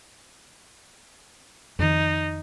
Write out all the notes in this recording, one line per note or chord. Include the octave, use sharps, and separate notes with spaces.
F2 D#3 D#4